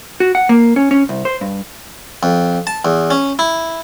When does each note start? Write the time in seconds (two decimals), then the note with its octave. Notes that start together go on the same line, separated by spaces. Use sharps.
0.20 F#4
0.35 F#5
0.49 A#3
0.76 C#4
0.91 C#4
1.09 C2
1.25 C5
1.41 G2
2.23 F2
2.67 A5
2.85 E2
3.10 C#4
3.39 E4